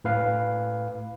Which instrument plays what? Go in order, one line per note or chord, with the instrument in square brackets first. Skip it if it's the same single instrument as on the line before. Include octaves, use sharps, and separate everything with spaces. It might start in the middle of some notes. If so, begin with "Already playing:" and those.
[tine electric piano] A2 B4 F5